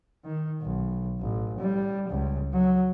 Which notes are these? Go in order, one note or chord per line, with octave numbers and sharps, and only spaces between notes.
D#3
B1
A1
G3
C#2
F#3